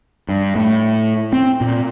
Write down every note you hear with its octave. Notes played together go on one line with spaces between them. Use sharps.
G2
A2
C4
A#2